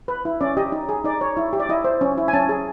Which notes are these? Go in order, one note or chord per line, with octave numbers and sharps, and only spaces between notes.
B4
E4
C#4 D5
G4 D#5
D#4
G#4
D#4 D5
C#5
E4
G4
D5
E4 D#5
C5
C#4
E4
G#5
C#4 A5
G#4